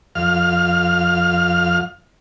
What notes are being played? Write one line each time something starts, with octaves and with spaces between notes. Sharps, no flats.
F2 F5 F6